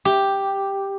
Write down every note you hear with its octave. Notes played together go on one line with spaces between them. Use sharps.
G4